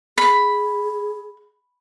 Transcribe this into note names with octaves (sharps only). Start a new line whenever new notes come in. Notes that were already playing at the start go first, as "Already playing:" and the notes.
G#4 B5